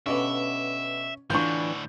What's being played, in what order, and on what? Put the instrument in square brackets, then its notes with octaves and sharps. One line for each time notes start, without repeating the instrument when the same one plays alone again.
[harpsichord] G2 B2 D3 [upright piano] C#4 [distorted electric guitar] E5
[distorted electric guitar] A2 D3 [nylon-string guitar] E3 D4 [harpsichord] F4 [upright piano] C#6 G6